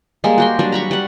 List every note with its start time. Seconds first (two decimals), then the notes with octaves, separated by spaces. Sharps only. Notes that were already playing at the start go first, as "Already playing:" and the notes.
0.24 G3 G#3 A#3
0.38 F#4 G4 C6
0.59 F#3 G3 D4
0.72 A#5 B5 C#6
0.91 G3 F#5